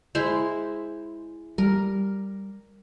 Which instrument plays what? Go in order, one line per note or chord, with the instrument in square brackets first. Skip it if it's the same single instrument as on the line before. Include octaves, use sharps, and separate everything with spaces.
[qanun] G#3 E4 C5
[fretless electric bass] G3 [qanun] A#4